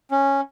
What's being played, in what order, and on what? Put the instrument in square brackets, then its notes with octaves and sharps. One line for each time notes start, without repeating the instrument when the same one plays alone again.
[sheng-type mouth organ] C#4